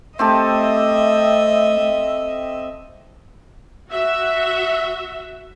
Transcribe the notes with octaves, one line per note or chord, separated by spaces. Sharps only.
A3 C4 G4 A4 D#5 E5
F#4 E5